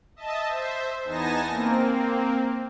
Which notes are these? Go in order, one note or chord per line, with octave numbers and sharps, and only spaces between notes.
D#5 E5 A5
C5 E5
E2 B3 D#4 G#5 A5 A#6
A#3 C4